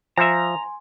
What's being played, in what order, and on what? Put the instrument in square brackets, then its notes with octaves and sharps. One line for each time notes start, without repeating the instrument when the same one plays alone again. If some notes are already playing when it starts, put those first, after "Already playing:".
[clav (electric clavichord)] F3 E5 [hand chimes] G#5 C6 [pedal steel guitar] A#5